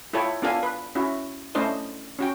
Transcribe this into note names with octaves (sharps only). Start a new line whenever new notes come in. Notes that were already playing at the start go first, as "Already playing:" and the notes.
E4 F4 A4 C#5 G5
B3 D4 F4 A4 F5 G#5
B4
C#4 E4 F#4
A3 C#4 D4 E4 C5 D#5
C#4 F#4 G5